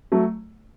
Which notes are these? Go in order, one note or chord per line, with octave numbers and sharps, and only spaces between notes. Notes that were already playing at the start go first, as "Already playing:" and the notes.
F#3 A3